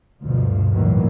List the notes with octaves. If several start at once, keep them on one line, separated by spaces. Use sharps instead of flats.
D2 G2 B2 F3
D2 A2 D#3 E3 F#3 A#3